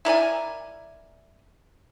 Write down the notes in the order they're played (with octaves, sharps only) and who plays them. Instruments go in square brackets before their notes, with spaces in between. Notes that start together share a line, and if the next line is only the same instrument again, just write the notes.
[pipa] E4 A#4 D5 G#5